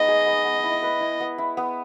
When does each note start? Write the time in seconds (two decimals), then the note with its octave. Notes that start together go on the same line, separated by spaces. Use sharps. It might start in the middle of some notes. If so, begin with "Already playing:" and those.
Already playing: G#3 B3 D#4 D#5
0.08 G#4
0.26 B3
0.44 B3
0.64 E4
0.83 B4
1.01 E4
1.20 B3
1.38 E4
1.57 B3